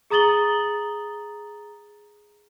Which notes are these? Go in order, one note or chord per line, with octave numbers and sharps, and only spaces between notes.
G#4 A#5 D#6 A6 F#7 G7